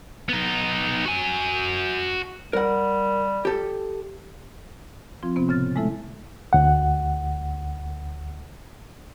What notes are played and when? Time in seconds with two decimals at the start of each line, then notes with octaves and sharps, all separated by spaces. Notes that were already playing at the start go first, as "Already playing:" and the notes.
0.29 B3 D#4
1.05 F#4 G#5
2.53 G3 A#4 F#5
3.45 G4 A4
5.23 F3 C4 F4
5.36 C3 B3 C4
5.48 A2 C#3 F6 A6
5.76 G#3 A3 E4 A4 E5
6.53 D2 F#5